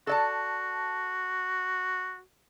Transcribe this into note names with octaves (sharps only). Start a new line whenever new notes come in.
F#4 A4 D5 A5